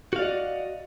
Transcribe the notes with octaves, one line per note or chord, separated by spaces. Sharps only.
F#4 D5 D#5 F5